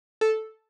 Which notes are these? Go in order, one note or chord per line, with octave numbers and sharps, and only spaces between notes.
A4